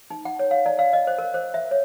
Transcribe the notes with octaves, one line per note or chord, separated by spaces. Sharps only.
D#4
F#5
C#5
F5
D5
F5
D#5
C5
A#4
C5
E5
C#5